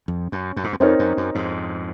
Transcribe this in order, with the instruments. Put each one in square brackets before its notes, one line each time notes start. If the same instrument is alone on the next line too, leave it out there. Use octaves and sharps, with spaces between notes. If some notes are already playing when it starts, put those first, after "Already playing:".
[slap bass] F2
F#2
F#2
G#2
F#2
[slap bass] F2 [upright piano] C4 D#4 A#4 C#5
[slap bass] F#2
F#2
F2 G#2